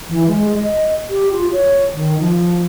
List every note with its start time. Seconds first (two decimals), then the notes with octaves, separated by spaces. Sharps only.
0.09 E3
0.27 G#3
0.54 D#5
1.10 G4
1.32 F4
1.52 C#5
1.93 D#3
2.19 F3